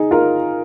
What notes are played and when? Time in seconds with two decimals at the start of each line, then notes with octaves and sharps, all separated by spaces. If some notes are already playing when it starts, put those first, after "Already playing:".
Already playing: D#4 G#4
0.11 F4 A#4